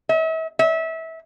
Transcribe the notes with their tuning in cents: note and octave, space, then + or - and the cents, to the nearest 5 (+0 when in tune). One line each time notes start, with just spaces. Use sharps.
E5 -40
E5 -25